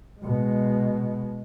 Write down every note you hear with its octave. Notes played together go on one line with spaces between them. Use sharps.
B2 G#3